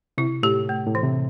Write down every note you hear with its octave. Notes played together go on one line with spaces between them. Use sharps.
C3 E4
A2 G4
A3
A2
E3
C3